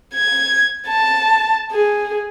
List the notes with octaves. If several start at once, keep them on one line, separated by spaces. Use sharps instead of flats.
G#6
A5
G#4